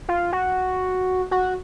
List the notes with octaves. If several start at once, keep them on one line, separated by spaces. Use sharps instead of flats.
F4
F#4
F#4